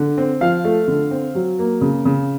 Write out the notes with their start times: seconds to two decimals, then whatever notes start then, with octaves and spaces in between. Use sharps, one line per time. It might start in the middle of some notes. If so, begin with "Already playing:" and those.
Already playing: D3
0.18 C4
0.41 F3 F5
0.65 A3
0.88 D3
1.11 C4
1.35 F#3
1.59 A#3
1.81 C#3
2.05 C#3